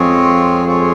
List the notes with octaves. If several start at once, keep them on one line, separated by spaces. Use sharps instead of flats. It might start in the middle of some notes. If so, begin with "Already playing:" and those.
Already playing: F2 G#3 C4 F4 G#4 C#5
G#3 C4 F4 G#4 C#5